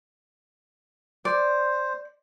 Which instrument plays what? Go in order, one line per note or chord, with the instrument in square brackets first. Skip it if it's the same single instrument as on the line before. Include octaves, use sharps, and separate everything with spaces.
[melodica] C5 [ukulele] D5